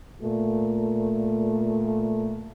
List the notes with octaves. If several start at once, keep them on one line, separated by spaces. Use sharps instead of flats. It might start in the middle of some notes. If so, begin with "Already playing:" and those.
A#2 A3